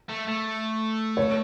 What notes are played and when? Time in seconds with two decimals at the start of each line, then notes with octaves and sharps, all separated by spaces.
0.09 A3
0.27 A3
1.17 C#5